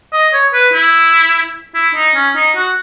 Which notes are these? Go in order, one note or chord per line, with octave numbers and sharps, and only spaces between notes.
D#5
C#5
B4
E4
E4
D#4
C#4
D#4
F#4